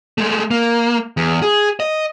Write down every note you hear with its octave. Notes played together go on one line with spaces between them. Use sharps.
G#3 A3
A#3
E2
G#4
D#5